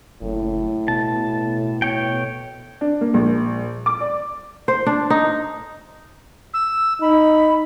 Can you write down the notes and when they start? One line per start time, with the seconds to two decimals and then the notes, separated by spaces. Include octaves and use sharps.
0.22 F#1 A2
0.88 B2 A5
1.82 C#5 G5
2.81 D4
3.01 A#3
3.14 A#1
3.86 D6
4.01 D5
4.68 C5
4.87 D4
5.10 D#4
6.54 E6
7.02 D#4 B5